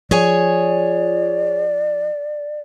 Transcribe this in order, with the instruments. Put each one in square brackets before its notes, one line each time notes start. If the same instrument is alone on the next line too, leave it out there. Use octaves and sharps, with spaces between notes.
[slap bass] F3 [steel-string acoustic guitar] G#4 C#5 G#5 [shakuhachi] D5